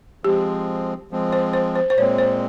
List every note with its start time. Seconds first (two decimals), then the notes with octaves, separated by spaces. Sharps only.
0.24 F3 G#3 C4 G4
1.11 F3 G#3 C4
1.32 C5
1.53 C5
1.75 C5
1.90 C5
1.97 A#2 G#3 C4 C#5
2.18 C5